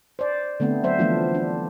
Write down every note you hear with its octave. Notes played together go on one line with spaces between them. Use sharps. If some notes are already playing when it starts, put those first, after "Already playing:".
C5 D5
D3 A3 B3 C4
F#3 D4 C5 E5
E3 F3 A3 B3 D4 F4
D4